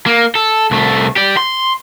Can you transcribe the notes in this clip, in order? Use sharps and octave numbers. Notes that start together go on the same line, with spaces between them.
A#3
A4
C2 A3
G4 D5
C6